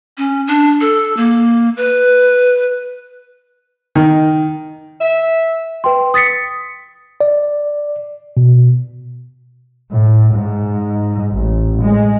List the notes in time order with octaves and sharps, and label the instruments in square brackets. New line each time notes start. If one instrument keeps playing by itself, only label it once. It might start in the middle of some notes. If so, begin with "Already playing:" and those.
[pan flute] C#4
D4
A4
A#3
B4
[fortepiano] D#3
[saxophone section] E5
[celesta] B4 G5 C6
D#6 A6 B6 C#7
[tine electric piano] D5
B2
[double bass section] A2
G#2
A1
G#3